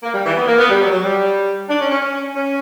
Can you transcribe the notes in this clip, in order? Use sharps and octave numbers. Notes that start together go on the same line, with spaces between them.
A#3
G3
E3
B3
A#3
B3
G3
F#3
F#3
G3
D4
C#4
C#4
C#4
C#4